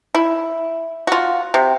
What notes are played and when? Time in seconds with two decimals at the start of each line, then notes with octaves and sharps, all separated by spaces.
0.15 E4
1.07 F4 F#4
1.54 C3